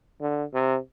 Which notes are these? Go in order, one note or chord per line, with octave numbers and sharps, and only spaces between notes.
D3
C3